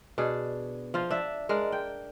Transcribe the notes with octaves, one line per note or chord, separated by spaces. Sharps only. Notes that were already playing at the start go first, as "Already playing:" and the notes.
B2 D4 G#4
F3 F4
D4 E5
G#3 D4 A#4
G5